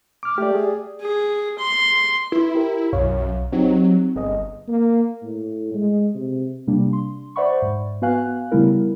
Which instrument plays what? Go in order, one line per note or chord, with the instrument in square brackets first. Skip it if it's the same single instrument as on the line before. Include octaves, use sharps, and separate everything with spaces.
[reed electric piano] D6 F6
[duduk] A3 [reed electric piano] G4 D5
[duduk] G#4
[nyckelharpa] G#4
C6
[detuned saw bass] E4 [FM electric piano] B4 C6
[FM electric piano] G4 A#4
[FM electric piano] B1 C#5 F5 [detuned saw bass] F#2
[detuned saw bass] F#3 [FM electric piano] C4 D#4 G4
[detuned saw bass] G1 [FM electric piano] G#4 D#5
[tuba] A#3
A2
G#3
C3
[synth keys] C3 G3 A#3 D4
C6
C5 D5 E5 F#5 B5 C#6
G#2
B3 F#4 B4 F5 G#5 F#6
C#3 G3 A3 B3 E4 A#4